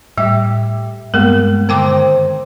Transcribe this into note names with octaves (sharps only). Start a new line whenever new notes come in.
A2 G3 G4 E5
G2 G#3 A#3 B3 A#4
D3 D#3 C4 G5 D6